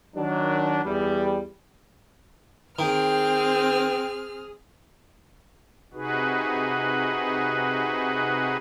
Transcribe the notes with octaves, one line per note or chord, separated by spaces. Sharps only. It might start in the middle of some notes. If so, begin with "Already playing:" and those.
D#3 F#3 D4
E2 G3
D#3 C4 G#4 G5 F6
C3 D#4 F#4 G#4 B4